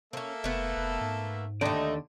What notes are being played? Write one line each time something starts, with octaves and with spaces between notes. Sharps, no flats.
A#3 C4 C#4 A4 E5
F1 A3 B3
F1
G#2
D#2 D3 A3 D#4 D5